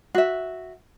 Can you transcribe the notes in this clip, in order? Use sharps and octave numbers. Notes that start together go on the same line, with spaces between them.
F#4 E5